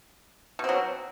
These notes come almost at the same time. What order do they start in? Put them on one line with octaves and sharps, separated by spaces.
B2 C4 F#3